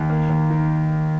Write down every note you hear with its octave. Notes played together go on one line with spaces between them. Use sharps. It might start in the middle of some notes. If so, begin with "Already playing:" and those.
Already playing: D#2
A#3
D#2
D#3